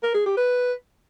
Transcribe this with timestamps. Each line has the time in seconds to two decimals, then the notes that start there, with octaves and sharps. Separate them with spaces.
0.03 A#4
0.14 G#4
0.26 G4
0.37 B4